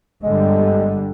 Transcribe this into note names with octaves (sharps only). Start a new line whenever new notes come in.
G1 D3 G3 G#3